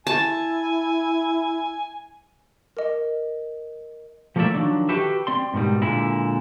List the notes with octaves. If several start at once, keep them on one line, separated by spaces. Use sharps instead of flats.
E4 G#5 A5
A#4 D#5
F3 A3 A#3 E4 D5 E5
D#3 F3 F#3 D4
F#4 G4 A4 B4 E5
C4 D5 C6
G#2 B2 D#3 G3
A#2 D3 G#3 E4